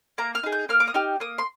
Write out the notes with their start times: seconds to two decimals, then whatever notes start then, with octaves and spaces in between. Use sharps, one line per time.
0.18 A#3 A#5
0.35 F6
0.43 D#4 G#4
0.52 G6
0.69 A#3 F6
0.80 D6
0.88 D#6
0.94 D#4 G4 F6
1.20 A#3 D#6
1.38 C6